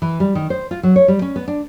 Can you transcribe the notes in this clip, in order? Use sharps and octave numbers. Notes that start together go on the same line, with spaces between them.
E3
G3
D#3
C5
F4
F#3
C#5
G3
C#4
B3
D4